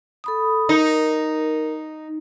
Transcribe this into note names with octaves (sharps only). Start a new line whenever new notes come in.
A4 B5 D#6
D#4 A#4